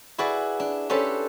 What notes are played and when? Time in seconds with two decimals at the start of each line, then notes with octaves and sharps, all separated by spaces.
0.18 E4 F#4 G#4 B4 D5
0.60 D4
0.90 C#4 D4 G4 A4 B4 C5